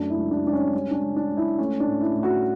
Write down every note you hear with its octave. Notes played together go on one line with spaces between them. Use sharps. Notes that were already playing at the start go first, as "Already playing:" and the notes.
Already playing: F#2 A3 D4
E4
C#2
D4
C#2 D4
C#4
G3 C#4
D4
C#4
C#2
D4
C#2
E4
A3 C#4
D4
A2
E4
A2
F#4